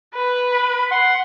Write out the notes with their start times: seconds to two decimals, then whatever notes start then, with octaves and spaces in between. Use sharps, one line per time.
0.14 B4
0.52 B5
0.91 F#5 C6